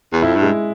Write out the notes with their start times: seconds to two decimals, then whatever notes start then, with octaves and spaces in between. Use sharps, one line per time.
0.12 E2
0.22 F2 E4
0.36 G2
0.42 G#3